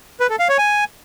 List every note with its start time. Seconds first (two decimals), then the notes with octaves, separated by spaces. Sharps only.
0.20 B4
0.30 A4
0.39 F5
0.49 C#5
0.58 G#5